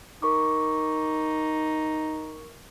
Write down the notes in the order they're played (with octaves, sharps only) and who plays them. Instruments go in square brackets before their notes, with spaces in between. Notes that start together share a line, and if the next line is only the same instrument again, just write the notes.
[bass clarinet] D#4 [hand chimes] A#4 C#6 D6